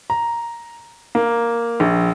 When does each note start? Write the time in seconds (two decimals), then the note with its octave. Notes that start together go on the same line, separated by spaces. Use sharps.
0.10 A#5
1.15 A#3
1.80 A#1